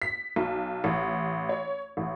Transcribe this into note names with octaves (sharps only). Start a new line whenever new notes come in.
B6
B1
A1
C#5
A1